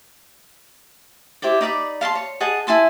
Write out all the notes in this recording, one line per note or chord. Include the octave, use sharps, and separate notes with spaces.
E4 G4 C5 D5
D#4 D5 E5 B5
F5 A5 B5 C6
C#5
G#4 D#5 F#5 A5
E4 G#5 A5 C6